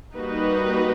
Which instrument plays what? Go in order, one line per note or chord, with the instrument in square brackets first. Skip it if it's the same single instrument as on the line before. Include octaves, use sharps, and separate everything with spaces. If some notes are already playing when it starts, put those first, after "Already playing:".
[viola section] G3 A#3 D#4 F#4 B4